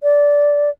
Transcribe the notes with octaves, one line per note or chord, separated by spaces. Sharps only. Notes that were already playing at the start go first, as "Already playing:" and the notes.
D5